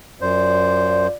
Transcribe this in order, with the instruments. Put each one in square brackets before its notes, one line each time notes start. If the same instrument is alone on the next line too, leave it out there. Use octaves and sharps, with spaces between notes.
[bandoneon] F#2 C5 [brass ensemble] F4 D5